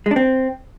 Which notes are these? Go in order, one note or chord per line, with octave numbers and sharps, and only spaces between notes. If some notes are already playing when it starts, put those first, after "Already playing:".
G#3
D4
C4